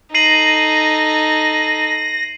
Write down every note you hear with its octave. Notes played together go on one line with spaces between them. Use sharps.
D#4 A4 A#6 C7 D#7 F#7